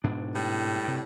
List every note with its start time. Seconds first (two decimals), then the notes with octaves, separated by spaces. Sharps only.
0.04 G#2 B2 D4
0.34 A2 G3
0.83 G2 C3